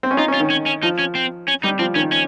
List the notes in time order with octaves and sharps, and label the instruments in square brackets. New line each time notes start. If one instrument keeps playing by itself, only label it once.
[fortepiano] C4
C#4
[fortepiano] D#4 [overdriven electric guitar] F4
[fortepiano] C#4
[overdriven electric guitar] F4
[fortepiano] D#3
[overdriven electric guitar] C#4
C#4
[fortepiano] F3 [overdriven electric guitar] D#4
[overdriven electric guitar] C#4
C4
C#4
[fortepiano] G3 [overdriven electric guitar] D#4
[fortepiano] F3 [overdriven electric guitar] C4
[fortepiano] D#3 [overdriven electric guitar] C#4
[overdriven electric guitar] C#4